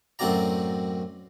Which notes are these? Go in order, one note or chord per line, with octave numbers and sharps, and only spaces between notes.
F#2 A2 C4 F#4 D5 A#5